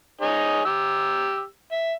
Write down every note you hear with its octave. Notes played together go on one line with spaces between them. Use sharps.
D#4 G#4 C#5
G4 E6
E5